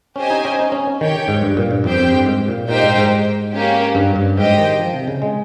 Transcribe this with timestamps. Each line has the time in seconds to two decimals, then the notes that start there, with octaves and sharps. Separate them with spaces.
0.16 C#4 G4 C5 D#5 G#5
0.30 D#4
0.45 C#4
0.59 D#4
0.72 C#4
1.00 D#3 G4 C#5 G5
1.28 G#2
1.43 G2
1.57 A#2
1.71 G2
1.84 F2 C4 G4 C5 G5
1.99 F2
2.12 G2
2.26 G#2
2.48 A#2
2.68 A#2 D#4 G4 C5 G5
2.83 G#2
2.97 G#2
3.53 A#3 C#4 G4
3.95 G2
4.16 G2
4.37 G#2 G4 C5 D#5 G5
4.58 D#3
4.79 F3
4.94 C3
5.07 C#3
5.22 G#3